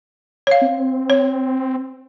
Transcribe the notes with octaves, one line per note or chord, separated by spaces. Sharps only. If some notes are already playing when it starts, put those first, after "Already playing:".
C#5 F5
C4
C#5